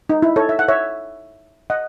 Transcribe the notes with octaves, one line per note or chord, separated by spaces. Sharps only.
D#4
E4
A4 C#5
E5
F#5
C#5 E5
D#5 F#5